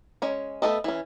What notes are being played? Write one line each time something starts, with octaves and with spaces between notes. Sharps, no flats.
G#3 C#4 C#5
A3 B3 G#4 A4 D#5
E3 C#4